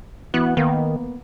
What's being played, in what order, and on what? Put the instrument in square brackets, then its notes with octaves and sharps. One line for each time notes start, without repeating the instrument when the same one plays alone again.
[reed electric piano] E3 F#4 F#6 [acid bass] B3
[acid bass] D#3 [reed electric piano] A#3 B3